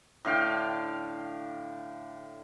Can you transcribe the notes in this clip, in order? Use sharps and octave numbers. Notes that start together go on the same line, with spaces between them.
A2 D3 F5 G5